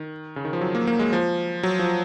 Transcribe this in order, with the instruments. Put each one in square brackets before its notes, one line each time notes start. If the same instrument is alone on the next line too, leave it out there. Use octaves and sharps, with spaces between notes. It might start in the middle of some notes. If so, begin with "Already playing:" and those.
Already playing: [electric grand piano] D#3
C#3
D#3
F3
F#3
A#3
A#3
G#3
F3
F#3
F3